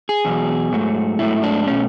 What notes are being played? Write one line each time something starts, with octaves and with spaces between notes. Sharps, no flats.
G#4
E2 B2 F#3
G#2 F#3 A3
G#2 F#3 A3 E4
D4
B2 A3 C#4